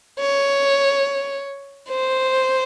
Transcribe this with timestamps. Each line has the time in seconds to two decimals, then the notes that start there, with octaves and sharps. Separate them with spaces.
0.19 C#5
1.89 C5